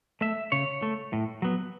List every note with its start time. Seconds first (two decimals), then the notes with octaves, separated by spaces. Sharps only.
0.21 A3 E5
0.52 C#3 C#5
0.82 A3
1.13 A2
1.42 F#3 B3